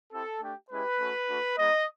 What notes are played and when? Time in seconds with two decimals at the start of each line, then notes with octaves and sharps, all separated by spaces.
0.12 C4 E4 G4 A4
0.41 A3 D4 G4
0.70 G#3 C#4 E4 G4 B4
0.99 A3 C#4 F#4
1.28 A3 D4 F#4
1.57 G#3 B3 D#4 D#5